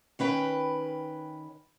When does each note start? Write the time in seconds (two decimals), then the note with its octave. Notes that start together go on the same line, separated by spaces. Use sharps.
0.19 D#3 C#4 B4 G5